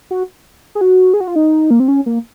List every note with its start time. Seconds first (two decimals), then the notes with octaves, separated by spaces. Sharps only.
0.11 F#4
0.75 G#4
0.81 F#4
1.14 G#4
1.20 F#4
1.28 F4
1.36 D#4
1.70 A#3
1.80 C4
1.88 C#4
2.06 A#3